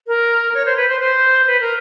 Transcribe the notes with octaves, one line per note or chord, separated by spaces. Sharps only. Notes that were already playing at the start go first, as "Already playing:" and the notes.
A#4
C#5
C5
B4
C5
C5
B4
A#4